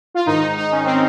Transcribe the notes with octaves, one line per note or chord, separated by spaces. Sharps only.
F4
G#2 D#3 D#4
D#4
C#4
C4